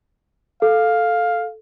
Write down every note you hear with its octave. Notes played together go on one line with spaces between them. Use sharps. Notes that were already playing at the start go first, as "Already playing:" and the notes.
A4 F5